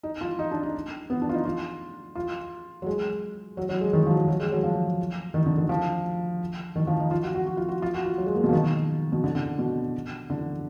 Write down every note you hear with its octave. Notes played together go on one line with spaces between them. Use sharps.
D#4
F4
D#4
D4
D#4
B3
D4
F4
D#4
F4
F4
F#3
G#3
F#3
F#3
G#3
D#3
F3
F#3
F#3
G#3
F#3
F3
D#3
D3
D#3
F3
D#3
F3
D#4
F4
F#4
F#4
F#4
F4
F#4
F4
F#4
F4
F#3
G#3
A#3
B2
F3
D#3
B2
D3
D3
B2
D3